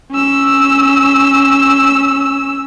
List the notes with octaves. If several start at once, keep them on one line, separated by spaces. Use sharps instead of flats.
C#4 E6